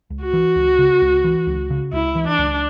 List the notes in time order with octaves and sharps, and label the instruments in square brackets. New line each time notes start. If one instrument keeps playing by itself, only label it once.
[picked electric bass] C#2
[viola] F#4
[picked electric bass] E3
C#2
C#3
C#2
E3
C#2
C#3
[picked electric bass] C#2 [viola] E4
[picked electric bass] E3
[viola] D4
[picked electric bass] C#2